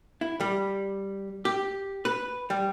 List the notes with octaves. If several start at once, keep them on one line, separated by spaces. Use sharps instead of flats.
E4
G3
G4
B4
G3